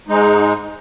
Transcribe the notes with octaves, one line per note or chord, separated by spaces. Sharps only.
G#2 G#3 D#4